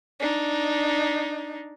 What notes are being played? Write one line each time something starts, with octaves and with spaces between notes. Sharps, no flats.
D4 D#4